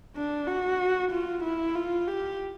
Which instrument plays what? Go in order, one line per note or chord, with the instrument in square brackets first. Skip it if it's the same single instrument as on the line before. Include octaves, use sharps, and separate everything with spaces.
[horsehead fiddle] D4
F#4
F4
E4
F4
G4